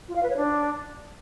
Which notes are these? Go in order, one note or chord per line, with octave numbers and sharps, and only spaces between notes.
F4
F5
B4
C#5
D4